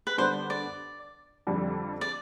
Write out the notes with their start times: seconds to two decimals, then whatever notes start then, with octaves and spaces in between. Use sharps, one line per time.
0.07 B4
0.18 D3 G3 B3 D4 C5
0.50 D5
1.47 F2 D3 G3 D4
2.01 D5